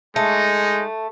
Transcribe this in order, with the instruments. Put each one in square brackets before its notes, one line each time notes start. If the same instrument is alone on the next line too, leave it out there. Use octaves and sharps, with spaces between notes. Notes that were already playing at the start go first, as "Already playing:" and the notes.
[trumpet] G#3 [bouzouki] A3 [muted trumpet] D#4